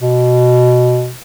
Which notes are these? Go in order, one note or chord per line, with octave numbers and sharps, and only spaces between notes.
B2